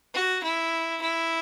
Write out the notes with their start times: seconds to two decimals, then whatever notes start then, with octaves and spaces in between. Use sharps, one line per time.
0.14 F#4
0.43 E4
1.02 E4